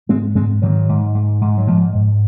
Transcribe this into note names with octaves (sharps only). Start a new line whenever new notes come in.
G#2 G#3 C4
G#2 G#3 C4
G#2 D#3 F#3
G#2
G#2
G#2
F#3
G#2 F3
G#2